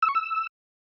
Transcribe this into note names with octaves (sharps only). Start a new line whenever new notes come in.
E6
C#6
E6